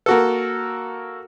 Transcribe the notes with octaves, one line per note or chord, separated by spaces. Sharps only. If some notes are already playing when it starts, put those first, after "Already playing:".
A#3 F#4 A4